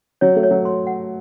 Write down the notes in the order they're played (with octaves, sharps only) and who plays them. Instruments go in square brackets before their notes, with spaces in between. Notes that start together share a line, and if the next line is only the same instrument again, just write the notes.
[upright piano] F#3 [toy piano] C#5
[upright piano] A3
[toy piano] C#5
[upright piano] F#3
[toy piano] C6
F#5